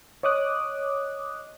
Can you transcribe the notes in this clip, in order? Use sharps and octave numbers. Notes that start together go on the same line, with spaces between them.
C#5 D#5 D6 D#6 F#6